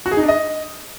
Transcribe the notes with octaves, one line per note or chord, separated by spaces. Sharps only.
F#4
G#4
D#4
D4
D#5